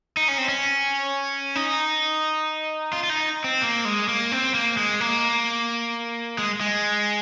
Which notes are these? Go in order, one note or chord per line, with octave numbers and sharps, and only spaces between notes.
D#4
C#4
C4
C#4
D#4
F4
F4
D#4
C4
A#3
G#3
A#3
C4
A#3
G#3
A#3
G#3
G#3